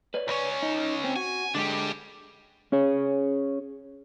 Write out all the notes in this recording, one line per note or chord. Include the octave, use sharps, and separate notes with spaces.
B4 C#5 D5
C#2 C#4
D#4
C4
F#4 G#5
D3 G#3 D4 G4
C#4 G#4 C#5